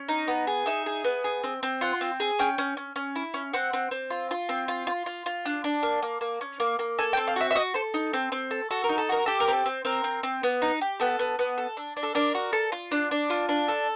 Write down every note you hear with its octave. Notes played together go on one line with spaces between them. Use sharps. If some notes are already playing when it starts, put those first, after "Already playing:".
Already playing: C#4
D#4
B3
G#4
D#4 E5
G#4
B3
G#4
C4
C4
F4 F#5
C4
G#4
C#4 G5
C#4
C#4
C#4
E4
C#4
C4 F#5
C4
C4
F4
F4
C4
F4
F4
F4
F4
D4
D4
A#3
A#3
A#3
C#4
A#3
A#3
A4 G#5
G5
C4
F5
F#4 E5
E5
F#4 D#5
A4 C5
D#4
C4
C4
A4
F#4 A4
A#4
D#4
A4
F#4 A#4
G4 A4
A#4
C4
A4
C4
C4 A#4
C4
C4
B3
D#4
G4
B3 A4
B3
B3
A4
D4
D4
A4
D4 A#4
F#4
A4
F4
D4
D4
F4
D4
A4